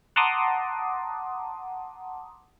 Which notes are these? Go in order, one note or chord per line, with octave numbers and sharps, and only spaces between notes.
F#5 A5 A#5 C6 D6 D#6